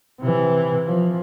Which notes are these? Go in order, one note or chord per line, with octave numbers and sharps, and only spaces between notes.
C3 E3
F3